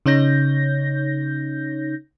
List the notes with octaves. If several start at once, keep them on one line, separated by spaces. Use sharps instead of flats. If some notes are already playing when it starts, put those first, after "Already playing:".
C#3 D#4 C#5 G6 A#6